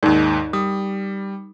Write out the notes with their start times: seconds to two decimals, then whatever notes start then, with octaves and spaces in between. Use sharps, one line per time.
0.03 D#2 G#2 D#4 A#4 D5
0.53 G3 D#6